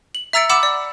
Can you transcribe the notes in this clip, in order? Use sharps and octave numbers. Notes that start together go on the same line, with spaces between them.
F#7
E5 A#5 E6 A6 C#7 D7
F#5 B5 D6 E6 E7
D5